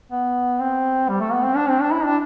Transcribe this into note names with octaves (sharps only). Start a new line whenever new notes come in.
B3
C4
G3
A3
B3
C4
D4
C4
D4
E4
D4